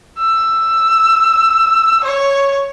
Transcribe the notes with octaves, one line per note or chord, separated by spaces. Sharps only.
E6
C#5